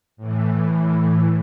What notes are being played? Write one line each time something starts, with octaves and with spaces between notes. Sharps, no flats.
A2 E3